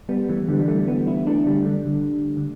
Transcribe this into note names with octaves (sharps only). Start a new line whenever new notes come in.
G3 B3
E3 A3
D3 G3
G3
E3 A3
G3 B3
B3 E4
A3 D4
D3 G3
D3 G3
D3
D3